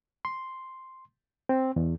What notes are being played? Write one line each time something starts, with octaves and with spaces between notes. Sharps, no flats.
C6
C4
E2